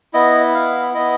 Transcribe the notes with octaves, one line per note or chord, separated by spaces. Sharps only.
B3 E4 D#5
F5
B3 E4 D#5